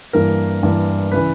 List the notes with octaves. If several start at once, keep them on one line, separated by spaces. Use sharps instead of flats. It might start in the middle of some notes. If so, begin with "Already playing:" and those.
G2 E3 A#3 A#4
G2 E3 A#3
C#3 E3 B4